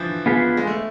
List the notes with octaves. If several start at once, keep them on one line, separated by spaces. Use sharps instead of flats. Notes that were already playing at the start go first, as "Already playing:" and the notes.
Already playing: E3 F3 D4
B3 F4 G#4 B4
G#3
A3